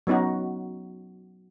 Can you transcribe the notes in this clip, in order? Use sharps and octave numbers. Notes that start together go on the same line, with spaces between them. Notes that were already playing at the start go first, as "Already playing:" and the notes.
F#3 B3 C#4 D#4 F#4